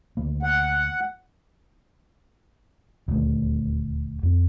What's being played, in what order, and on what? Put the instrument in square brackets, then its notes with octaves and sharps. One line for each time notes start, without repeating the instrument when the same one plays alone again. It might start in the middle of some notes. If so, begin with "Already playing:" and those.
[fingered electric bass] D2 A#3
[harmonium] F#5
[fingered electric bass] D#1 D2 A3
F2